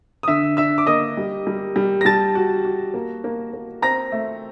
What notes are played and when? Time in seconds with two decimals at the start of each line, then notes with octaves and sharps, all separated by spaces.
0.23 D#6
0.28 D3 E5 E6
0.57 D4 E5 E6
0.78 D6
0.86 A#3 D#5 D#6
1.17 G3
1.47 G3
1.76 G3
2.01 A#6
2.05 G3 A5 A6
2.35 F#4
2.65 F#4
2.94 A#3
3.24 A#3
3.54 A#3
3.82 C4 A#5 A#6
4.12 A3